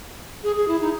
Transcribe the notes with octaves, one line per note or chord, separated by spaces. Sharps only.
G#4
G#4
E4
D#4